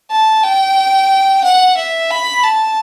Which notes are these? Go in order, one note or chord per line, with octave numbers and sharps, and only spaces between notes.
A5
G5
F#5
E5
B5
A5